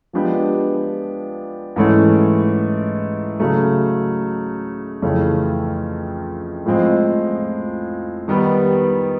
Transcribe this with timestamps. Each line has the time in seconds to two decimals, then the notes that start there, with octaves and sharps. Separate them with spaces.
0.13 F3 G#3 B3 D4 G4
1.76 G#2 E3 A3 C#4
3.40 C#3 F#3 A3
5.02 F2 C#3 E3 A3 C#4
6.66 A2 F3 G#3 C4
8.28 D#3 G3 B3